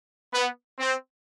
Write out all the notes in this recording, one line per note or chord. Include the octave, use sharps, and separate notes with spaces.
B3
C4